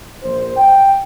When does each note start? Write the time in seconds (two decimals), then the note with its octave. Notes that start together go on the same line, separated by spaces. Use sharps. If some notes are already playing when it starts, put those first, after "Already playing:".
0.22 A#1 C5
0.57 G5